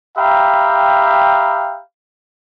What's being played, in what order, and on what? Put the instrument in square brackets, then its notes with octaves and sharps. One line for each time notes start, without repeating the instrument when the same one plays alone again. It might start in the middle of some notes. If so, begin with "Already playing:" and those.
[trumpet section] G4 E5 F5 G5 A#5 B5